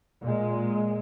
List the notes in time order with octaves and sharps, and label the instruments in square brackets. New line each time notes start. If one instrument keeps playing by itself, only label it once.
[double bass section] A#2 G#3